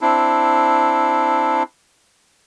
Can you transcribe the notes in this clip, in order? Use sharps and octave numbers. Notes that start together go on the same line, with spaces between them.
C4 D4 E4